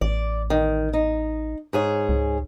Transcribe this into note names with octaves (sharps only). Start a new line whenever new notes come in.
A1 D5
D#3
D#4
G#2 G#4 C#5
C#2